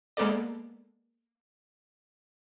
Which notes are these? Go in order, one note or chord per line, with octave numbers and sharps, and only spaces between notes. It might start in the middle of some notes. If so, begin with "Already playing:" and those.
G#3 A#3 B3 A4 D5